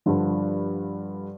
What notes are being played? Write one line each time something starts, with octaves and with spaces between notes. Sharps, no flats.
G2 D3 F3